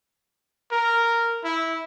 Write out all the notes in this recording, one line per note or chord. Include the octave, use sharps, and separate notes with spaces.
A#4
E4